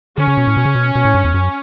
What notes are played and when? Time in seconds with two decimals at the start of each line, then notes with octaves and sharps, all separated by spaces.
0.18 D3 C#4
0.28 C#3
0.37 B2
0.47 A2
0.57 B2
0.66 C#3
0.75 B2
0.95 B2
1.05 A2
1.15 G2
1.25 E2
1.34 F#2